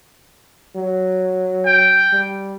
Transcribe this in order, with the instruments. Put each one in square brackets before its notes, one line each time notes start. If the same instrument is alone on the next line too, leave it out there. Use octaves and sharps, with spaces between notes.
[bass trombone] F#3
[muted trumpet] G5
[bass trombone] G3